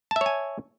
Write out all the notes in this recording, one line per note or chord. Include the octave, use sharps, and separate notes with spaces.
C#5 E5 G#5 A5